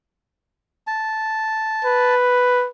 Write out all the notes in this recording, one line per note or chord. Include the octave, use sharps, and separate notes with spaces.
A5
B4